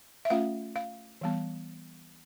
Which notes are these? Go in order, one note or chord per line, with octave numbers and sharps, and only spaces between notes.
E5
A3 C#4 F4 F5
F5
E3 G3 B3